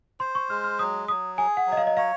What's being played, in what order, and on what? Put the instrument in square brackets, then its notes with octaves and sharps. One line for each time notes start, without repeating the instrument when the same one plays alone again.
[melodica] C5 [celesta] C6
[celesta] C#6
[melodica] G#3 [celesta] F6
[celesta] F6
[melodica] F#3 [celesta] D#6
[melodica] F#3 [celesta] D#6
[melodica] G#4 [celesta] G#5
[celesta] F#5
[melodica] F#3
[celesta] D#5
F5
D#5
[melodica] C#5 [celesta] F5